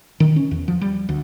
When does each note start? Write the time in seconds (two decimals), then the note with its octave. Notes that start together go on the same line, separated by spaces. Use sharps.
0.20 D#3
0.36 C#4
0.51 E2
0.68 F3
0.81 G3
1.09 D2